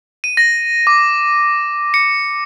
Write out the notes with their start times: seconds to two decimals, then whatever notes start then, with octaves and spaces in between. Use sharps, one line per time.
0.24 D#7
0.37 A#6
0.87 D6
1.94 C#7